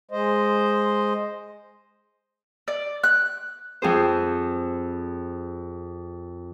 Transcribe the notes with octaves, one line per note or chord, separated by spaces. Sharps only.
G#3 C5 D#5
D5
F#6
F2 G#4 C5